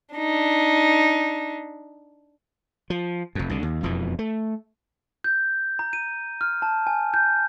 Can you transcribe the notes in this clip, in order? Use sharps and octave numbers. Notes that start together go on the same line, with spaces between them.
D4 D#4
F3
F1 F2
C2 D3
D#2
E1 F2 B2 E3
A3
G6
A#5
D#7
F6
A5
G#5
G6